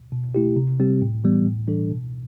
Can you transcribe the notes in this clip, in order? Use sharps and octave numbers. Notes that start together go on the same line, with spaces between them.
B2
A3 E4 G4
C3
G3 C4 G4
A2
E3 G3 B3
A2
E3 G3 D4 A4
B2